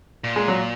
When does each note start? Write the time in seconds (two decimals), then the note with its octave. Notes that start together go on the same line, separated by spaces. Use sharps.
0.24 A#2
0.36 G#3
0.48 F#3